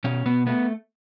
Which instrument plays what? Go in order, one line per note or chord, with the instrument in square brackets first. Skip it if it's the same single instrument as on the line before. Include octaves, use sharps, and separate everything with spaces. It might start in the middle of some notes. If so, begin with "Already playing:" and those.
[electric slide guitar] B2 C#4
B2 B3
A3 B3